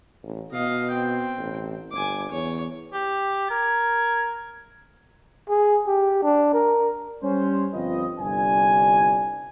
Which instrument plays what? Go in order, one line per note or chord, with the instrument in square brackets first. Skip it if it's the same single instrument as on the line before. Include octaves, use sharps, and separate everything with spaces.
[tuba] A1
[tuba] B2 [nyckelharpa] D#5 F5
[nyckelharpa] C4 G5
[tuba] A1
[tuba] G1 [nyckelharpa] G#5 D6
[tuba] E2 [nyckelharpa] C#5
[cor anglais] G4
[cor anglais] A#4 [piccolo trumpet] G#6
[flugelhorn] G#4
G4
D4
A#4
[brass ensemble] G3 C#4 C5
G1 F3 C4 F4 B4 D#5
G1 C2 G2 G3 D4 G#5